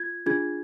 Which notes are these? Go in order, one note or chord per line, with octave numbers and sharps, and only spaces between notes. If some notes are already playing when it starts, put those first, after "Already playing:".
Already playing: F4 G#6
D4 F4 G#4 G#6